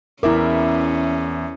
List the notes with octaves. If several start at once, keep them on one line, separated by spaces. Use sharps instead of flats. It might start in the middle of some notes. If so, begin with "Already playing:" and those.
E2 C#4 E4 A#4 E5 D6